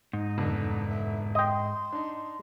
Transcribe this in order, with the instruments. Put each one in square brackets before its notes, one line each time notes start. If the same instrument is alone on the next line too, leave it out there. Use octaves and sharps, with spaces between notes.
[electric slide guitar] G#2 [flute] D#4
[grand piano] F1 E2 D3
[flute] E5
[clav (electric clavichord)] D#5 G5 [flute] C6
[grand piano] D4 D#4